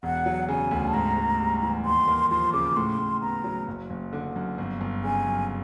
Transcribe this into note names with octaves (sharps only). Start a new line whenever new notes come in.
E1 F#5
F#3
C#3 G#5
D2
A5
G#2 A#5
G#2
G3
E3
D#2 C6
A#3
F3 C6
C#3 D6
A2 C6
A2
B3 A#5
F#3
F#1
F#1
D3
F#2
G1
G1
C#3 G#5
F#2